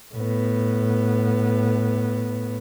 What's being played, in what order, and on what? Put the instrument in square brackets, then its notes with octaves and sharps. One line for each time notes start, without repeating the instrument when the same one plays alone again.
[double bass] A2 B3